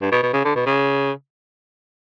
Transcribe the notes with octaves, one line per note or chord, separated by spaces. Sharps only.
G2
B2
B2
C#3
D3
B2
C#3